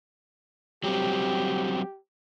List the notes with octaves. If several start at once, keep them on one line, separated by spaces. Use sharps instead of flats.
F#3 G3 C4 G4